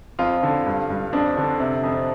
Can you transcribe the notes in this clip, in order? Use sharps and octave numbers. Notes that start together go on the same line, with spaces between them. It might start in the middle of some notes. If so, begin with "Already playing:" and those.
F2 F4
D3
G2
G2
F2 D4
D3
C3
F2